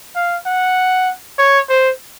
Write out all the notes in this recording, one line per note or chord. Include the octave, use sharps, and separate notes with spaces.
F5
F#5
C#5
C5